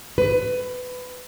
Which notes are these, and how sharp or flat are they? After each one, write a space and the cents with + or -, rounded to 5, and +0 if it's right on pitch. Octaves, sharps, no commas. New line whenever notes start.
B4 +20